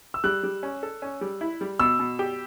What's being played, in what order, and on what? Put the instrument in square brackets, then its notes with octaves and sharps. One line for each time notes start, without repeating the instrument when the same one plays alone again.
[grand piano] E6
[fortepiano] G3 [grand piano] F#6
[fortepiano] G3
C#4
A4
C#4
G3
E4
G3
[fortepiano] B2 [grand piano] E6
[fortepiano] B2
G4